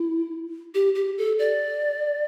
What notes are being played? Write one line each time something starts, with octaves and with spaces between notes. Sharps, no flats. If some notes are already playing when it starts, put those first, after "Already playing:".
Already playing: E4
G4
G4
A4
D5